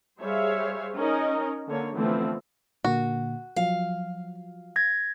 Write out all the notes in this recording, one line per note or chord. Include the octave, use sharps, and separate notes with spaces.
G3 G#4 C5 C#5 E5 F5
C#4 D#4 A#4 D#5
D3 A#3 C#5
D3 E3 F3 A3 B3 C4
A#2 D3 A#3 F#4
F3 F#3 F5
G#6 A#6